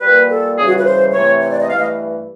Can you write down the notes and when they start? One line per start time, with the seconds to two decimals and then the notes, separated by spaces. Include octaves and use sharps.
0.01 A#2 G3 A#3 B4
0.30 A4
0.57 C#3 E3 G3 G#4
0.67 F#4
0.79 B4
0.85 C5
1.14 C3 E3 A3 C#5
1.41 C#5
1.51 D5
1.60 D#5
1.70 G2 E3 A3 F5
1.79 D#5